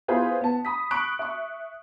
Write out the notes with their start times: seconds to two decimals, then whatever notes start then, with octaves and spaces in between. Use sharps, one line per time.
0.08 B3 E4 F4 G#4 B4 C5
0.41 B3 A5
0.65 B5 D#6 B6
0.91 B5 C#6 F#6 D7
1.19 E5 C#6